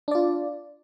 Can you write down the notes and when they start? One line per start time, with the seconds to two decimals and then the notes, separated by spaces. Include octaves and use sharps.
0.08 D4
0.11 D5
0.15 F4